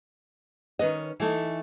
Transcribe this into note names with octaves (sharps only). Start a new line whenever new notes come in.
D#3 C#4 B4 D#5
E3 A3 D#4